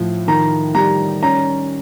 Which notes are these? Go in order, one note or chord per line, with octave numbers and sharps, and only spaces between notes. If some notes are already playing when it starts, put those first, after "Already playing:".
Already playing: A2 F3
D#3 A#5
G3 A#5
C#4 A#5